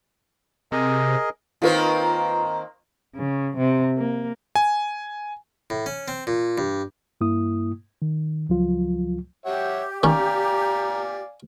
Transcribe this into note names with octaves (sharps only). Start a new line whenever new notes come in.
C3 G#4 A#4 D#5
D#3 A#3 C4 F4 B4
C#3
C3
A#3
G#5
A2
C#4
C4
A#2
G2
G2 A#3 E4 D#6
D#3
C#2 F3 F#3 F4
G4 C#5 E5 F#5
D#3 C#4 D5 F5 G#5 A#5